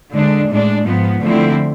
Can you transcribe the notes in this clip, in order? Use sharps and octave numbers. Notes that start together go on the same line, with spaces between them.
D3 G#3 D4
A2 G#3 D4
G#2 F3 B3
D3 F3 A3 C4 E4